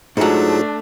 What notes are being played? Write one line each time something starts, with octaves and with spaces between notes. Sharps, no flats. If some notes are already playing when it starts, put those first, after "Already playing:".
G#2 F#3 A3 D4 D#4 F4 G#4